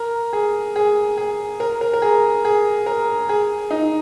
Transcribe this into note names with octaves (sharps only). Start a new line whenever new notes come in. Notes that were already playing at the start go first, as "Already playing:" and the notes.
Already playing: A#4
G#4
G#4
G#4
A#4
A#4
A#4
G#4
G#4
A#4
G#4
D#4